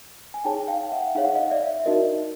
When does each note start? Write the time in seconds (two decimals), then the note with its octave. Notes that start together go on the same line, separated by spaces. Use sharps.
0.34 G#5
0.44 D#4 G#4 C#5 G5 A5
0.68 F5 G5
0.92 E5 F#5
1.15 D#4 G#4 C#5 F5
1.25 F#5
1.35 D#5 F5
1.50 D5 E5
1.80 E5
1.85 D#4 F#4 A#4 D#5